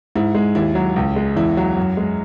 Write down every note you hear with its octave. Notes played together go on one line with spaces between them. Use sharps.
G#2 E4
G#3
D#2 E4
F#3
C#2
G#3
E2 E4
F#3
F#2
G#3